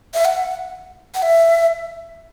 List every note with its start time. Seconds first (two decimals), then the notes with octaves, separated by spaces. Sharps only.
0.14 E5
0.25 F#5
1.15 F#5
1.22 E5